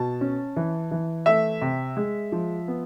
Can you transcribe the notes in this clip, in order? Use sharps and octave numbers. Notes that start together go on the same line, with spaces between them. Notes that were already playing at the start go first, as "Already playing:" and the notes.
Already playing: B2 A5
C#4
E3
E3
A3 E5
C3
G#3
F3
B3